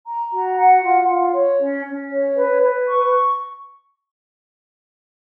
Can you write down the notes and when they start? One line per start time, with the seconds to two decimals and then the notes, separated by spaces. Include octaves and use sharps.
0.05 A#5
0.31 F#4
0.56 F#5
0.81 F4
1.07 F4
1.33 C#5
1.58 C#4
1.84 C#4
2.10 C#5
2.35 B4
2.61 B4
2.86 C#6